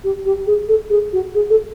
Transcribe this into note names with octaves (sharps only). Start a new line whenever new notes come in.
G4
G4
G#4
A4
G#4
F#4
G#4
A4